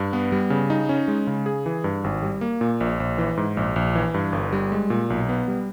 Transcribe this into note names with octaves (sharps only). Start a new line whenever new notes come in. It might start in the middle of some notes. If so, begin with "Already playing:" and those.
Already playing: G2
B3
G3
C#3
D#4
C#4
G#3
C#3
G#4
E3
G2
G#1
G3
A#3
A#2
A#1
A#1
E3
G#2
A#1
A#1
E3
G2
G1
G3
G#3
A#2
B1
B3
G3